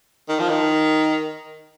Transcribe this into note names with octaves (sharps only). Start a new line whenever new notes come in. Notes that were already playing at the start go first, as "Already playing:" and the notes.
D#3
F3
D#3